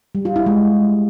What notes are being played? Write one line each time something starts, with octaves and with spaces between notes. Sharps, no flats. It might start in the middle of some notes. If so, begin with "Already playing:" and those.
G3
F4
E4
G#3